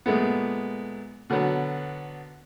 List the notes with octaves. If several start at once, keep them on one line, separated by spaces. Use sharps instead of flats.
A#2 G#3 A3 B3
B2 D3 F#3 B3